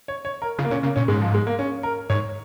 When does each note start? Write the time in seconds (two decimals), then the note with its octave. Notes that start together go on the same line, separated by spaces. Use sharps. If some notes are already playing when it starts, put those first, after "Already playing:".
0.08 C#5
0.25 C#5
0.42 A#4
0.59 C#3 F4
0.65 A#3
0.70 A#2 C#4
0.83 C#3 A#3
0.96 A#2 C#4
1.08 G#2 G#3
1.22 F3
1.34 G#3
1.47 A#3
1.59 C#4
1.83 A#4
2.10 G#2 C#5